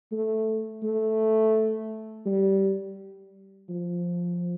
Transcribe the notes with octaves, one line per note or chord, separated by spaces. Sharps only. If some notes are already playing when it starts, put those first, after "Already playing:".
A3
A3
G3
F3